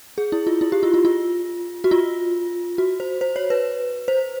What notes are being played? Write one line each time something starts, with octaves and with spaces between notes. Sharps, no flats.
G#4
E4
F4
E4
G4
F4
F4
F4
F#4
F4
F#4
C5
C5
C#5
B4
C5